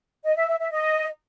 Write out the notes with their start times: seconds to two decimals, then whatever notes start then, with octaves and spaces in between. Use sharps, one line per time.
0.24 D#5
0.36 E5
0.48 E5
0.60 E5
0.71 D#5